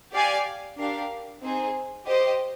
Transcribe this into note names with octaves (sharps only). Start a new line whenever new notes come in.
G4 D5 F5 G#5
D4 G4 A#4 F5
C4 D#4 G#4 C5
G4 C5 D#5